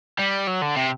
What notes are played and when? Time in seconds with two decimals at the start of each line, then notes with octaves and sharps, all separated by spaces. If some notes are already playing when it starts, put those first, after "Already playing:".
0.19 G3
0.47 F#3
0.62 D3
0.76 C3